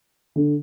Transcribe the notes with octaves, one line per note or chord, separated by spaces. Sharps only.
D3